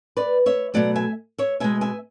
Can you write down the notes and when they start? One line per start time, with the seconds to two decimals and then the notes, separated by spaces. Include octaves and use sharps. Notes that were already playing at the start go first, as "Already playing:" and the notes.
0.17 B4 D5
0.46 C#5 E5
0.74 B2 F#3 A3 D5 F#5
0.95 E5 G#5
1.38 C#5 E5
1.60 B2 G#3 E5 G#5
1.81 E5 G#5